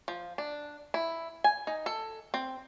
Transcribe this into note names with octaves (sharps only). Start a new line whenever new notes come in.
F3
D4
E4
G#5
D#4
A4
C4